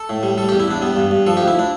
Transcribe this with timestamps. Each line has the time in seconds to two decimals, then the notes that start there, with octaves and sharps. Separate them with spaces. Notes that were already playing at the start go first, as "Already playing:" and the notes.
Already playing: A4
0.09 A2
0.23 G3
0.38 G3 A4
0.49 E2 G4
0.60 E4
0.68 E2 D4
0.82 G3 B3
0.96 G2
1.11 G2
1.26 F3 A4
1.37 D2 G4
1.48 E4
1.59 D4